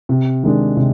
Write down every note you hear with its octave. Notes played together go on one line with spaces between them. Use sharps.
C3
D#3 G#3 D4
C3